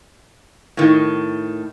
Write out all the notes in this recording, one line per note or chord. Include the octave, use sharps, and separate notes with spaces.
A2 D#3